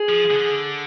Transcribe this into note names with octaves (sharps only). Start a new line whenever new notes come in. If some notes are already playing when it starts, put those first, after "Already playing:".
Already playing: G#4
F3
D3